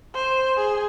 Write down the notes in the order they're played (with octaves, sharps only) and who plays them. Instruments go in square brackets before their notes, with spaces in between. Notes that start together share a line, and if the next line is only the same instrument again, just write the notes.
[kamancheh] C5
G#4